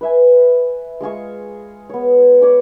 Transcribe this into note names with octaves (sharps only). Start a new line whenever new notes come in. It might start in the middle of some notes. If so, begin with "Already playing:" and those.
B4 E5 G#5
G#3 F4 G#4 C#6
B3 C#5
C#5 D5 D6